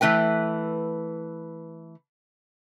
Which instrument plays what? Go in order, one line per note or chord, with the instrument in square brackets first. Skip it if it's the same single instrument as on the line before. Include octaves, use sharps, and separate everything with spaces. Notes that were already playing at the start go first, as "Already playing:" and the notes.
[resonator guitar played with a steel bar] E3 A3 B4 G5